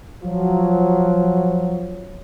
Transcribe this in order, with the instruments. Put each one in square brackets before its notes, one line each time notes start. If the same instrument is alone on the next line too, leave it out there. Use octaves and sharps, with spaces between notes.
[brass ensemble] F3 F#3